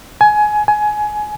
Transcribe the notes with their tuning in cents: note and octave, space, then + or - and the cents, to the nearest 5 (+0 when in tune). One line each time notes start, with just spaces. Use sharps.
G#5 +20
G#5 +20